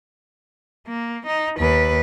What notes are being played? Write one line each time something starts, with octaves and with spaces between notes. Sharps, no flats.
A#3
D#4
D#2 B4